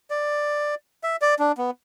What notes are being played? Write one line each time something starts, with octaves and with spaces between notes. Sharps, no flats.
D5
E5
D5
D4
B3